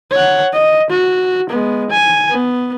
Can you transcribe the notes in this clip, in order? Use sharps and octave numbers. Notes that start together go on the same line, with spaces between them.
C#5 F#5
D#5
F#4
G#3 B3
G#5
B3